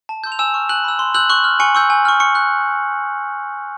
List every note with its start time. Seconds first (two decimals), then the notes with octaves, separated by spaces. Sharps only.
0.09 A5
0.24 C6 E6 G6
0.32 F7
0.39 G#5 E6 E7
0.54 C#6 F6
0.69 G#5 F#6 F#7
0.84 B5 E6
0.99 C6
1.14 E6 F#6 G6 F#7
1.29 C#6 F#6 F#7
1.44 F6
1.60 G#5 C#6 C#7
1.75 C#6 E6 G6
1.90 G#5
2.05 C#6 F6
2.20 C#6 C#7
2.35 F#6